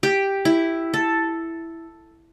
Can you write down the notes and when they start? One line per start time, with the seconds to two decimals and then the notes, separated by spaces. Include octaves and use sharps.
0.03 G4
0.45 E4
0.94 A4